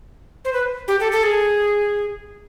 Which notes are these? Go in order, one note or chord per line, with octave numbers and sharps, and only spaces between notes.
C5
B4
G4
A4
A4
G#4